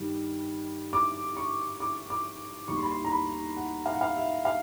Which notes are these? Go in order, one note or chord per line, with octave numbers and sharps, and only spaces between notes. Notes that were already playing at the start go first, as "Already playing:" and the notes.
Already playing: G2 D#3 G3
D6
C#6
D6
D6
D#2 D#3 G3 C#6
C6
B5
C6
A#5
B5
F#5
F5
F#5
F5
E5
F5